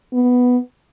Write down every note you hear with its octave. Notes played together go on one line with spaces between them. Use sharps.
B3